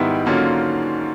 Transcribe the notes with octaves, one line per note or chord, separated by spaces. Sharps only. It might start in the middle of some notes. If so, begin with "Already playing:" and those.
Already playing: G#2 D#3 G3 B3 E4
D3 F#3 A#3 C#4 F4